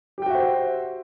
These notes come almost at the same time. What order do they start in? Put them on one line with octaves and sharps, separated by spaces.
G4 G5 F#4 E5 C5